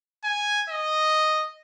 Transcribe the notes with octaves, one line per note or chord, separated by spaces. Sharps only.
G#5
D#5